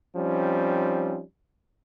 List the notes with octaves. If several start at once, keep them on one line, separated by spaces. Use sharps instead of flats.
F3 G3 C4 C#4 D#4